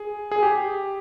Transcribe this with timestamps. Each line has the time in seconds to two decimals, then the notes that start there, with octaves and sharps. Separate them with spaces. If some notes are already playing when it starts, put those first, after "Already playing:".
Already playing: G#4
0.31 G#4
0.43 G4